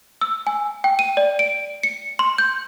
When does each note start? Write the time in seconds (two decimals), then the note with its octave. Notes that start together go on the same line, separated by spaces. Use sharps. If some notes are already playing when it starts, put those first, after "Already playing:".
0.21 E6
0.47 G#5
0.84 G5
0.99 D#7
1.17 D5
1.39 D7
1.83 C#7
2.19 C6
2.38 G6